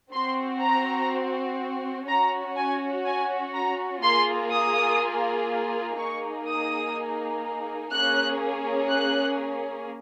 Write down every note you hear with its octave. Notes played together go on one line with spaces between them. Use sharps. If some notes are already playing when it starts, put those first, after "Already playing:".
C4 F#4 C6
A#5
C#4 F#4 A#5
G#5
G#5
A#5
A#3 F4 G#4 C6
D#6
A#3 D#4 G#4 C#6
D#6
A#3 C#4 G#4 F#6
F#6